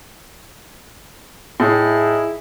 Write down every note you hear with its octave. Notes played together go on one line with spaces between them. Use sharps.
A2 D#4 E4 G#4